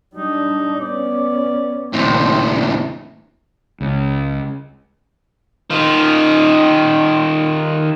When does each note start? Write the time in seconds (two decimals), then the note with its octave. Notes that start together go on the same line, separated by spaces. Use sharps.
0.15 G3 D4 D#4
0.80 B3 C#4 D5
1.93 A#1 D#2 A2 C#3 C4
3.80 C#2
5.70 D#3 F4